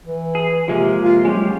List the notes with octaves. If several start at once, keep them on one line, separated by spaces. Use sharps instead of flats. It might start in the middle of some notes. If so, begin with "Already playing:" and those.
E3
G#4
C3 F3 G#3 A#3
F4
F#3 G#3 C#4 G4